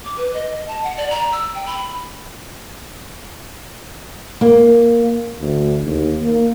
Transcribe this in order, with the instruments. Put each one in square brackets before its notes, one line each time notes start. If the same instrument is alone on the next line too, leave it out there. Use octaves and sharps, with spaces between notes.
[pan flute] D6
B4
D#5
A5
F#5
D5
A#5
E6
G5
B5
[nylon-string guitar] A#3
[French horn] D2
D#2
A#3